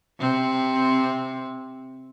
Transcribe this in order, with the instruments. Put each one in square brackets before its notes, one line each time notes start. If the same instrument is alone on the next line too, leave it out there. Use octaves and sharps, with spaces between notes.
[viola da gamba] C3 C4